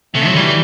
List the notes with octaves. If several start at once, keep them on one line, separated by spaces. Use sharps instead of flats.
C3 A3
F#3
E3 G3